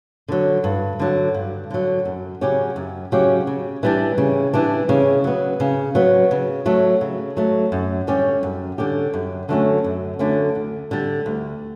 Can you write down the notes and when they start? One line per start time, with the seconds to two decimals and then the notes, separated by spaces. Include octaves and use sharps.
0.28 D3 F#3
0.64 G2
1.00 D3 F#3
1.34 G2
1.71 D3 F#3
2.05 F#2
2.41 C#3 F#3 C#4 G4
2.76 F#2
3.12 C#3 F#3 C#4 G4
3.47 C#3
3.83 E3 G3 D4
4.18 C#3
4.53 E3 G3 D4
4.89 C#3
5.24 F#3 B3
5.60 C#3
5.95 F#3 B3
6.31 C#3
6.66 F#3 A3
7.01 C#3
7.37 F#3 A3
7.72 F#2
8.07 D3 G3 C#4 G4
8.43 F#2
8.78 D3 G3 C#4 G4
9.14 F#2
9.49 D3 F#3 A3 C#4
9.84 F#2
10.19 D3 F#3 A3 C#4
10.55 D2
10.91 D3 G3
11.26 D2